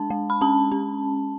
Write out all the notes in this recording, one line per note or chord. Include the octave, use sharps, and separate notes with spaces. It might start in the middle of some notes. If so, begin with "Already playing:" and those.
Already playing: G#3 D4 A5
G#3
B5
C#4 A5
C#4